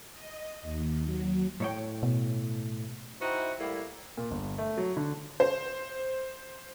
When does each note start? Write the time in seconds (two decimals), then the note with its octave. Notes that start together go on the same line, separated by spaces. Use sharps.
0.12 D#5
0.62 D#2
1.04 F#3
1.60 A2 C#5 G5
2.03 B2
3.22 D#4 E4 F#4 C5 E5 G5
3.59 A2 G3 A#3 E4
4.17 A#2
4.31 G1
4.58 A3
4.78 F#3
4.97 D3
5.40 C5